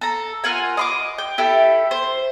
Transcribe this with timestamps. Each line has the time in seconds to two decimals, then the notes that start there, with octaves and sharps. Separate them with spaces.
0.01 A4 A#5
0.44 F4 A#4 F#5 G#5
0.77 D#5 C6 D6
1.18 G5
1.38 E4 G4 A4
1.91 C5